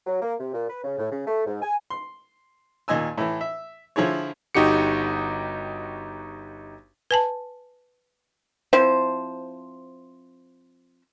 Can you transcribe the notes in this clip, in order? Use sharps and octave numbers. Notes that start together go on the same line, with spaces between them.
F#3
A#3
C3
A#2
B4
C#3
A2
C#3
A3
G#2
G#5
C6
D#2 A#2 D#5 G#5 E6
A2 E3
E5
D3 F3 E4 G#4 C#5
G1 D#4 F#4 G4 C#7
B4 G#5 A5
F3 C4 E4 C5